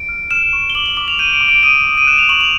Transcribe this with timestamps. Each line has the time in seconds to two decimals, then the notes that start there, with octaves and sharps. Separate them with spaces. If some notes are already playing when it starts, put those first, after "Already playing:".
Already playing: D7
0.09 F6
0.31 F6 E7
0.53 C#6
0.70 G7
0.75 D6 F#7
0.86 G7
0.97 D6 F#7
1.08 F7
1.19 G6 D#7
1.33 D7
1.41 D6
1.49 D7
1.63 D#6 D#7
1.85 D#6
1.98 D#7
2.07 F#6 E7
2.19 F7
2.29 C#6 F#7
2.41 F7